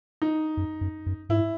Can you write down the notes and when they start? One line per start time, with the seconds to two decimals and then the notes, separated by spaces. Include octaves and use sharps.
0.22 D#4
0.57 F#2
0.81 F#2
1.06 F#2
1.29 G#2 E4